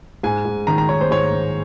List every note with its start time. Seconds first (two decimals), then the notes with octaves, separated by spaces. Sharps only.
0.23 G#2 G#5
0.45 G#2
0.67 D#3 A#5
0.78 A#5
0.89 D#3 C#5
1.01 C5
1.11 G#2 C#5
1.34 D#3